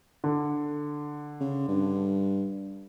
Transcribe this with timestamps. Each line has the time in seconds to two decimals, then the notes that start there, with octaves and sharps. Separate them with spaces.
0.24 D3
1.40 C#3
1.68 G2